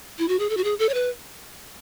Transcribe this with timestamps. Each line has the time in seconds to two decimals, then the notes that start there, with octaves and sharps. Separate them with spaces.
0.19 E4
0.28 F#4
0.39 G#4
0.50 A4
0.57 F#4
0.64 G#4
0.79 A4
0.89 C#5
0.94 B4